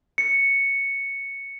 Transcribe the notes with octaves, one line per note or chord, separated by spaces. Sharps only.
C#7